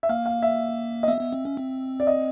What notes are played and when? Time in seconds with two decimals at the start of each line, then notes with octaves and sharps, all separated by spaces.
0.03 E5
0.09 A#3 F5
0.26 F5
0.42 E5
1.03 D#5
1.08 B3 E5
1.21 B3
1.33 C4
1.45 C#4
1.57 C4
2.00 D5
2.07 D#5